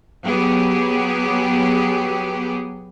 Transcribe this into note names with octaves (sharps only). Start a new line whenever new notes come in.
F#3 B3 G4 G#4